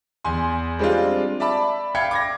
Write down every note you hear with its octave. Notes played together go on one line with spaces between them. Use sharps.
E2 G#5 C6
G3 G#3 C4 D4 F4
D5 E5 A5 B5 D6
E5 F5 G5 B5 G#6 C#7
D6 G#6 A#6